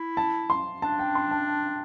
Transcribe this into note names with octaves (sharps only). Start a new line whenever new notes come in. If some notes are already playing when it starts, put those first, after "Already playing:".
Already playing: E4
A5
C6
D4 A5
G5
C6
A5